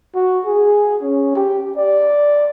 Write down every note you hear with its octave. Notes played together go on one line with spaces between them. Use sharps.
F#4
G#4
C#4
G4
D5